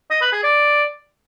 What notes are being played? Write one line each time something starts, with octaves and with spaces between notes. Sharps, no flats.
D#5
B4
G#4
D5